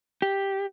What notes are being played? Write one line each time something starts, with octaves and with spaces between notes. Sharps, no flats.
G4